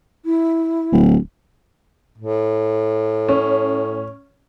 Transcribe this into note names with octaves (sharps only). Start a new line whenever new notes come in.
E4
D1
A2
C#4